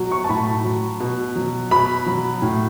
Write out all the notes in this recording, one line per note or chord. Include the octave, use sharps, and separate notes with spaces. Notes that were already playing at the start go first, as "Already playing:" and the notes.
Already playing: B2 F#3
C#6
A5
A2 B5
F#3
B2
F#3
B2 B5
F#3
A2